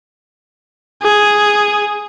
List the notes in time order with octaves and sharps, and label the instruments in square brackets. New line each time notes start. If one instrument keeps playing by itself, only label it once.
[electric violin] G#4